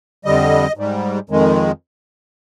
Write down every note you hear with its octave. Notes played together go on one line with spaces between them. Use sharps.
F2 D3 G3 D#5
G#2 G3
F2 D#3 G#3